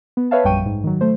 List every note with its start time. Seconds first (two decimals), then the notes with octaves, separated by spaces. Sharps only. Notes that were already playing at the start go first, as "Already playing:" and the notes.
0.17 B3
0.31 B4 C#5 E5 F5 A5
0.44 A#1 F#2 G3 G5 C#6 D#7
0.66 G#2
0.84 D#3 F#3
1.01 A3 C5